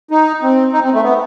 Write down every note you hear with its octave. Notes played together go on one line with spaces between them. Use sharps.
D#4
C4
D#4
C4
A3
B3